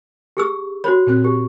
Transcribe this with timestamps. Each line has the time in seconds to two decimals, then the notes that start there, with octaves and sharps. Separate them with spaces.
0.37 G4 G#4 E6
0.84 F#4 C5 C#5 B5
1.07 A#2 C4 F#6
1.24 G4